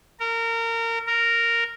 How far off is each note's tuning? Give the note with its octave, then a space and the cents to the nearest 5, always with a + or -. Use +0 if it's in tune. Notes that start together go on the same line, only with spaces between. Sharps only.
A#4 -25
A#4 -5